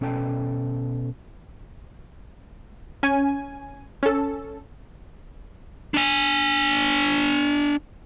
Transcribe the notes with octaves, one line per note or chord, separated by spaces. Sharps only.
B2 C#4 A4 G5 A5
C#4 G#5
C#4 A4
D4 G#5